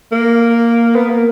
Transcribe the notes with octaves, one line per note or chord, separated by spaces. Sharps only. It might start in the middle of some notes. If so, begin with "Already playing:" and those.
A#3
B3
A#3